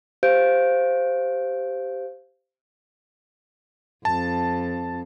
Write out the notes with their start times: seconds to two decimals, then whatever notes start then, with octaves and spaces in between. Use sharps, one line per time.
0.23 G4 C5 F5 G6 D7
4.05 F2 A5